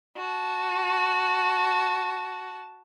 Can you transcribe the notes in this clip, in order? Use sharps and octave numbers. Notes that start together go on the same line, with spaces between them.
F#4 A5